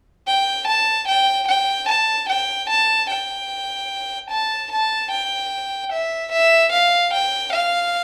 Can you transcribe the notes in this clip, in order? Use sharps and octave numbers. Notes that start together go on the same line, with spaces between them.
G5
A5
G5
G5
A5
G5
A5
G5
A5
A5
G5
E5
E5
F5
G5
F5